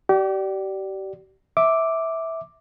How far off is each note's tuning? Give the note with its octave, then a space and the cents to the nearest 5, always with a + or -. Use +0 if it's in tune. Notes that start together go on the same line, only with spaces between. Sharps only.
G4 -35 D5 +0
E5 -15 D6 +0